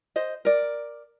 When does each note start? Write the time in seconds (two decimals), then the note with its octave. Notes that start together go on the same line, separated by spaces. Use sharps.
0.16 C5 D#5
0.45 A#4 D5